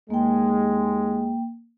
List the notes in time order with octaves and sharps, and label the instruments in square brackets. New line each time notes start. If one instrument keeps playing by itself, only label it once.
[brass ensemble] D#2 G#3 [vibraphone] A#3 G5